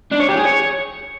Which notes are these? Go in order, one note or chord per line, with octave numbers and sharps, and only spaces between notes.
D4
C#5
G4
G#4
C#5